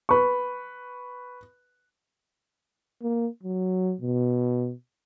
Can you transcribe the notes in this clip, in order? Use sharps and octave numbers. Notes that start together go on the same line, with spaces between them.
B4 C#6
A#3
F#3
B2